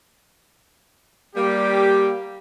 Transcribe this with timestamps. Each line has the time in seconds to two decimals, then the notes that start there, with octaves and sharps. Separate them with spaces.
1.36 G3 A#3 G4